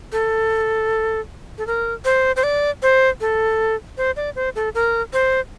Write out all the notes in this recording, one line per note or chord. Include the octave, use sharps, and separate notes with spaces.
A4
A4
A#4
C5
C5
D5
C5
A4
C5
D5
C5
A4
A#4
C5